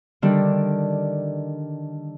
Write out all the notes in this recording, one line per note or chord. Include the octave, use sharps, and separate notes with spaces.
D3 D#3 G3 D4